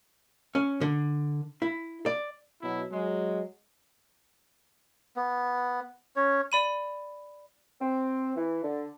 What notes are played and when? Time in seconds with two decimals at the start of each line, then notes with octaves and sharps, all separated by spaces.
0.55 C#4
0.81 D3
1.62 E4
2.06 D5
2.61 B2 F#3 E4
2.91 F#3 G#3
5.16 B3
6.16 C#4 C#5
6.52 D5 B5 D#7
7.80 C4
8.36 E3
8.64 D3